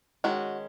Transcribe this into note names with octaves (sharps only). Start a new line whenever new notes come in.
D#3 G#3 C#4 F#4